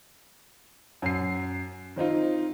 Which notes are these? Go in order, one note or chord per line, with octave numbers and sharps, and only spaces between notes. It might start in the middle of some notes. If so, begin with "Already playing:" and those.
F#2 C7
D#3 C4 D#4 F4